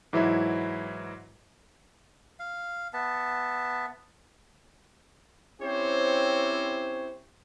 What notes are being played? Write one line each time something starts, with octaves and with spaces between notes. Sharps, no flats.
G#2 E3 F#3 E4
F5
B3 E5 A5
C4 C#4 E4 G4 C5 C#5